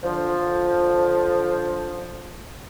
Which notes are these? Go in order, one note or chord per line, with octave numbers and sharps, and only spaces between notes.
D3 F3